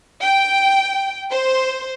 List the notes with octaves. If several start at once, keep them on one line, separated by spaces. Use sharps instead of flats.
G5
C5